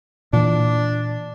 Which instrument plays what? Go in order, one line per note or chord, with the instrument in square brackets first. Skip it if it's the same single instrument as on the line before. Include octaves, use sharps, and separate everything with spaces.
[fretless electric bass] A#2 E3 [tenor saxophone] D4